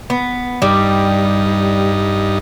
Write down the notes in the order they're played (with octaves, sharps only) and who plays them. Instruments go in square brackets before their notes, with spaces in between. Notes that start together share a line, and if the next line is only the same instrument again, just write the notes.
[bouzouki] B3
[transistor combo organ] G2 D#4 [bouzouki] G3